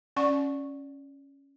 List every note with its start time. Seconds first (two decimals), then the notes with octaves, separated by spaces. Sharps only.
0.16 C#4 D5 F#5 C#6